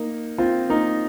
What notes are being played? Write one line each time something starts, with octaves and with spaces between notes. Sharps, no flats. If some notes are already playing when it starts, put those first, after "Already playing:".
Already playing: A#3 D#4
C4 F4
A#3 D#4